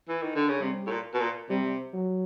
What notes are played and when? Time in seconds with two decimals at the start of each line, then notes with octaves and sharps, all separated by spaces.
0.09 E3
0.22 D#3
0.36 D3
0.49 C#3
0.61 C3 G3
0.87 A2
0.91 A#2
1.14 B2
1.21 A#2
1.50 C3 G3
1.94 F#3